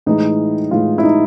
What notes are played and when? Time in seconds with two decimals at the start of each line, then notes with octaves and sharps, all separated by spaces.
0.06 A2 E3 G#3 D#4
0.71 A2 E3 G#3 F4
0.98 E4
1.03 D#4